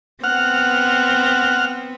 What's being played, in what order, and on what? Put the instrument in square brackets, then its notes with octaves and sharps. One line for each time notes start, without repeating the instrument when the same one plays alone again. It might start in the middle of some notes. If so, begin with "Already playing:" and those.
[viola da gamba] B3 C4 [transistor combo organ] F#5 F6